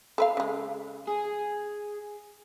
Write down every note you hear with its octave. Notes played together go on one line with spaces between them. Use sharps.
A4 B4 F5
C#3 G#3
G#4